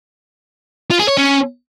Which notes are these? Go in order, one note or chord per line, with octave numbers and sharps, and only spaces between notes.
F4
G#4
C#5
C#4